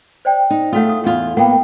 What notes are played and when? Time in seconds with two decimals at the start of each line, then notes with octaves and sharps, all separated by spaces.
0.25 C5 D5 G5
0.50 D#4
0.72 A3 F4 A4 F5 F#5
0.89 D#6
1.04 E2 F4
1.37 A#3 B3 F#5 G5